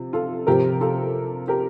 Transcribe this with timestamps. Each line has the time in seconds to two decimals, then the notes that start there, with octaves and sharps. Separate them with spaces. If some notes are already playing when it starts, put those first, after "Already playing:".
Already playing: C3 F3
0.13 F4 A4
0.47 C3 F3 G4 A#4
0.80 F4 A4
1.48 G4 A#4